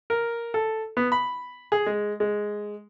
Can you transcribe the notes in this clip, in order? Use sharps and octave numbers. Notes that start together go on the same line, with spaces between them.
A#4
A4
B3
B5
G#4
G#3
G#3